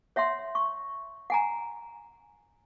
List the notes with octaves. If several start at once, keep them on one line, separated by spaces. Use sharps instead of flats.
C#5 E5 F#5 C6
C#6
F#5 G#5 A#5